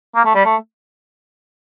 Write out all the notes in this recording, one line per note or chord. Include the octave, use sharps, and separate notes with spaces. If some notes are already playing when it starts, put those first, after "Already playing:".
A#3
A3
G3
A3